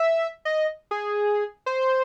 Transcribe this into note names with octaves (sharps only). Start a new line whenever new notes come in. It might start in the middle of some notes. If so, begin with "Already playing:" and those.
Already playing: E5
D#5
G#4
C5